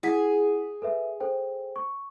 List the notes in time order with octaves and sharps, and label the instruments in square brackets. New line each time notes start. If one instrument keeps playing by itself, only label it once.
[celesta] E4 F#5 B6 [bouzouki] G#4
[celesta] A4 B4 E5
A4 C5 G5
C#6